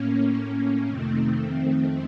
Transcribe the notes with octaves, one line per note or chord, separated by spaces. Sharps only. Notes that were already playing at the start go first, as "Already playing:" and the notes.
Already playing: A2 A#3 C#4
A2 A#3 C#4
F2 C3 D#3 A3 C4
F2 D#3